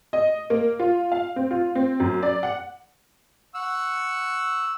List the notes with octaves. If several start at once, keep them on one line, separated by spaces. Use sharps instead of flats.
D#5
A#3
F4
F5
C4
F4
C4
F#2
D5
F#5
F#5 C#6 E6